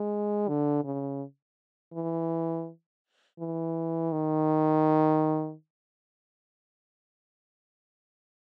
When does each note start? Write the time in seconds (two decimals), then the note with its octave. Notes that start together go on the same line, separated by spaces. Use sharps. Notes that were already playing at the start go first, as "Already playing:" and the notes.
Already playing: G#3
0.48 D3
0.85 C#3
1.93 E3
3.40 E3
4.12 D#3